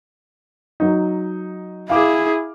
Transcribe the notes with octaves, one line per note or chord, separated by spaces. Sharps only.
F#3 D#4
E4 G#4 F5 D6